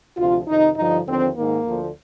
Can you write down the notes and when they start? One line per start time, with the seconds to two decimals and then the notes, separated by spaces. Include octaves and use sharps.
0.17 D2 C3 F3 F4
0.48 F2 C3 D#3 D#4
0.77 G2 D3 F3 D#4
1.06 D#2 D3 F3 C4
1.36 G#2 D#3 A#3
1.66 D2 D3 F3